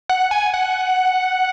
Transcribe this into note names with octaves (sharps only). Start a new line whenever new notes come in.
F#5
G#5
F#5